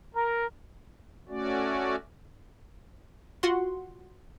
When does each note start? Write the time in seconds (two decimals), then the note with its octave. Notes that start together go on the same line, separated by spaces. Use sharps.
0.15 A#4
1.29 A3 C#4 F#4 D5
3.43 F4 F#4 F#5 C6